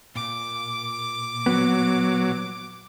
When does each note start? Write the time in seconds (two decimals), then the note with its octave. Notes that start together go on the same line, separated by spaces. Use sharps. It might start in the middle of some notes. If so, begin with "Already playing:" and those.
0.16 A#2 D6
1.46 F#3 B3